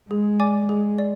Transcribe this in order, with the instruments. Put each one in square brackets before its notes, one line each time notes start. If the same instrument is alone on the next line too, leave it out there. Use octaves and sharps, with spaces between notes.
[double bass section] G#3 [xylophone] G#4
[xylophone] D5 G#5 D6
[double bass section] G#3 [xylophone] G#4
[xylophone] D5